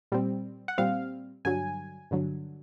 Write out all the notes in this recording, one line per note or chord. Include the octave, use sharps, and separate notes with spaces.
A#2 G3 C4
F#5
A#2 G3 C4 F5
G2 D3 F#3 G#5
G2 D3 F#3